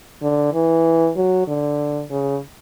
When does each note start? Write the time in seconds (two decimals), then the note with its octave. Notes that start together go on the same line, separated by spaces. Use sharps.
0.22 D3
0.53 E3
1.17 F#3
1.48 D3
2.10 C#3